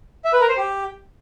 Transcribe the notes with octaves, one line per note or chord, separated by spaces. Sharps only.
E5
B4
A#4
C5
G4